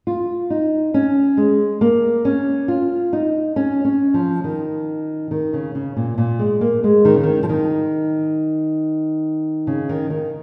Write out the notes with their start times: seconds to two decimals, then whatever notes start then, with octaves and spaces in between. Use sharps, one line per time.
0.07 F4
0.50 D#4
0.94 C#4
1.37 G#3
1.81 A#3
2.25 C#4
2.68 F4
3.13 D#4
3.56 C#4
3.85 C#4
4.14 F3
4.44 D#3
5.31 D#3
5.53 C#3
5.75 C#3
5.96 A#2
6.18 A#2
6.39 G#3
6.61 A#3
6.84 G#3
7.05 D#3
7.14 C#3
7.23 D#3
7.43 F3
7.49 D#3
9.67 C#3
9.89 D#3
10.10 D#3